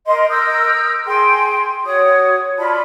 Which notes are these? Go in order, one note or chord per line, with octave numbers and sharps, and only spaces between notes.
A#4 D#5 C6
A#4 D#6 E6 G6
G#4 G5 C6
F#4 C#5 D#6
F4 D5 A5 B5